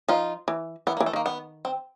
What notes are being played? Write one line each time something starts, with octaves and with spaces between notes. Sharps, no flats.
F3 D#4 F4
E3
E3 B3
A#3
E3
A3
D#3 A#3
B3
C4